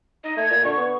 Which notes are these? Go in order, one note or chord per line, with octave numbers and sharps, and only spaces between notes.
D#4 D#5
A3 G#6
A#2
D3 C#6
B3